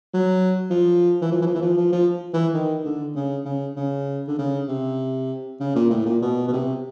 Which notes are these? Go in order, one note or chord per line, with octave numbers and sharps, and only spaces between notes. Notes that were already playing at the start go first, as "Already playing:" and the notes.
F#3
F3
E3
F3
E3
F3
E3
F3
F3
F3
E3
D#3
D3
C#3
C#3
C#3
D3
C#3
C3
C#3
A#2
A2
A#2
B2
B2
C3